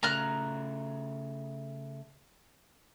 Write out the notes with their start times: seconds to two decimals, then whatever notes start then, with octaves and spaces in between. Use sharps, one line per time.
0.03 C#3 A3 A#5 F6 F#6